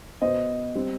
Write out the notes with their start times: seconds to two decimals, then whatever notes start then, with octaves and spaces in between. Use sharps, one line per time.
0.22 B2 B3 C5 D#5
0.75 G3 C4